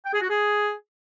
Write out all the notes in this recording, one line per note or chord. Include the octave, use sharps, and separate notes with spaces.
G5
G#4
F#4
G#4